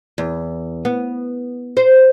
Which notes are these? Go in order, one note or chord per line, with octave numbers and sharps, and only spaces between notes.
E2
B3
C5